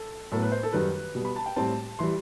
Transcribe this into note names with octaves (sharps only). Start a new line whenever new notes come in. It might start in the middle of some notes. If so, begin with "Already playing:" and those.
Already playing: A4
A2 F#3 B3 A4
B4
C5
A4
F#2 D#3 G3 B4
B2 G3 B3
B5
A5
G5
A2 G3 C4 A5
E3 G3 C6